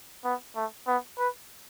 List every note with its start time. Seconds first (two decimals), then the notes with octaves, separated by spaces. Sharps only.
0.25 B3
0.56 A3
0.87 B3
1.19 B4